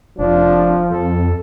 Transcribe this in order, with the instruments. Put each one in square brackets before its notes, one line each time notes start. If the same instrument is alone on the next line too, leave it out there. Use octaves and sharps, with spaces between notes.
[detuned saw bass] F1 [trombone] F3 [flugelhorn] D4
[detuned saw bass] F2 [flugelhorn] A4